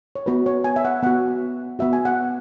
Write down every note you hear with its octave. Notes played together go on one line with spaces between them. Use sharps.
C#5
B3 F#4 B4
C#5
G#5
E5
F#5
B3 F#4 F#5
B3 F#4 E5
G#5
F#5